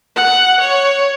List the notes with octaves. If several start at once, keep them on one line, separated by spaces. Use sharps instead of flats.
F#5
C#5